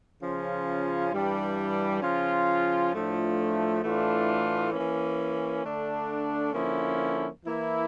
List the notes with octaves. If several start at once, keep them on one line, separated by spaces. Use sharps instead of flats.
C#3 F3 C#4 F4
G2 E3 G3 D4
C#3 F3 C#4 F4
A2 F3 A3 D4 F4
A2 E3 A3 D4 F4
E3 A#3 C#4
D3 A3 D4
D3 F3 A#3 C#4 E4
E3 A#3 E4